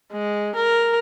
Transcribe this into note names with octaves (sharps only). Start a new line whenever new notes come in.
G#3
A#4